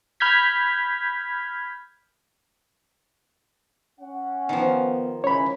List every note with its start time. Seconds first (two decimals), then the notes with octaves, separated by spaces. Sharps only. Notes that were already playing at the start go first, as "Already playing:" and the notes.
0.20 B5 F6 G6 G#6 B6
4.00 C#4 F#5
4.49 D#3 F3 B3
5.24 C#3 E3 G#3 C#4 C#5 B5